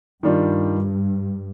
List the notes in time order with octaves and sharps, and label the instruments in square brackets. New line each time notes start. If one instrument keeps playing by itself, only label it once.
[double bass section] G2 [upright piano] D#3 G3 D4 F4